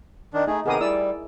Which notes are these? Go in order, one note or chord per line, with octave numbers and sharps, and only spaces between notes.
D#3 D4
A3 D#4 G#4
C3 D#3 B3 G#4 A#4 D#6
G3 E4 D5 E6